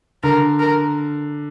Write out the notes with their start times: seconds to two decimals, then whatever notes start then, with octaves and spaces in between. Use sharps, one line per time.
0.23 D3 A#4
0.60 A#4